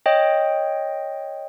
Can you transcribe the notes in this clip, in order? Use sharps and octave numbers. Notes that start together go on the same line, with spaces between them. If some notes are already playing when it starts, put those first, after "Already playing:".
C#5 D#5 G5